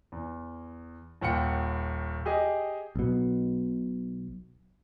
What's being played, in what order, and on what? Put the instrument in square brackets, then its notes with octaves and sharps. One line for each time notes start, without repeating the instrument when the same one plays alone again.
[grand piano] E2
D#1 D#2 F#5 G5 C#7
G4 G#4 D#5
[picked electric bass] B1 B2